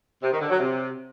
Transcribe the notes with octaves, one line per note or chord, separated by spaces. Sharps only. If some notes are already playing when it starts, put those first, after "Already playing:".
C3
D#3
D3
F#3
C3